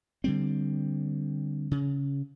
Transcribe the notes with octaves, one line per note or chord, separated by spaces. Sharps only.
D3 G3 C4
C#3